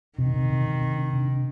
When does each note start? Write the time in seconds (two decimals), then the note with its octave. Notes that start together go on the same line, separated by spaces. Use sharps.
0.18 C3 D#3
0.34 C3
0.50 C3
0.66 C3
0.81 C3
0.97 D4
1.13 C3
1.28 D4